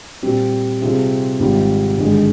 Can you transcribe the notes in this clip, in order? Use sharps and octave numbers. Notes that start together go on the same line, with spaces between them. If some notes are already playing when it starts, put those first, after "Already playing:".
A#2 G3 C4 G4
C3 G3 C4 F4 G#4
G#1 G#2 G3 C4 F4
G#1 G2 D3 G#3